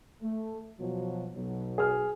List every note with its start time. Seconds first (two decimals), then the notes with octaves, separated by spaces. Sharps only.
0.22 A3
0.78 B2 F3 F#3
1.36 B1 B2 F#3
1.78 G#4 F6